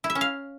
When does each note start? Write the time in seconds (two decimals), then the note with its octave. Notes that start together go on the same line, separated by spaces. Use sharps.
0.04 E4
0.10 E5
0.15 C#4
0.21 F5